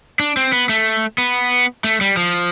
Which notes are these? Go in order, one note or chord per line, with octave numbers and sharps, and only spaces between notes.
D4
C4
B3
A3
B3
A3
G3
F3